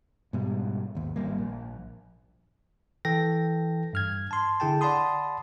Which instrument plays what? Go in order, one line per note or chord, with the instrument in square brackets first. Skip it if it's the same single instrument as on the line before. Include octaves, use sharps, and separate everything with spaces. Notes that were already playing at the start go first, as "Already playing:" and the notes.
[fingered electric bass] G#2 B2 G3
G#1 D#2
G#1 G3 A#3
A#1
[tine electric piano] E3 A4 G5 A#6
G2 F6 G#6
A5 C6
D3 E4 G#4 G5 A5
D5 F#5 A5 B5 C6 D#6